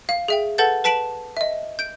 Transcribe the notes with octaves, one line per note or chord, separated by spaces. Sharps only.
F5
G#4 E5 G5
A4 B4 F#5 A5 G6 A6
B4 A5 B6 D7 E7 F#7
D#5 E5
G6 D7